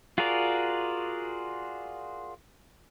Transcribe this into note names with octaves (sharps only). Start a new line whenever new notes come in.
F4 F#4 G#4 A#4 D5